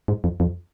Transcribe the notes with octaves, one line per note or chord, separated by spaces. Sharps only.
G#2
F2
F2